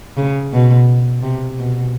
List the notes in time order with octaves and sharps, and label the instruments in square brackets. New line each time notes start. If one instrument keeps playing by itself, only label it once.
[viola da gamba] C#3
B2
C3
B2